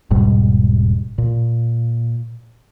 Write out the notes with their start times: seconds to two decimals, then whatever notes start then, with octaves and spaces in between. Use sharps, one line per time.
0.11 E1 G#2 B2 G3
1.18 A#2